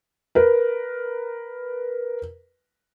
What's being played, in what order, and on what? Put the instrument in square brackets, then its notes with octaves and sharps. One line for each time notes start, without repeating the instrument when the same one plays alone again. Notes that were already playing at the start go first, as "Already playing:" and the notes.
[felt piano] A#4 B4